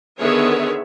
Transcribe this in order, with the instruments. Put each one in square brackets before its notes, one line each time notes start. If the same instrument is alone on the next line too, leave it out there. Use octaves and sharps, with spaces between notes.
[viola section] D3 D#3 B3 G#4 C#5 E5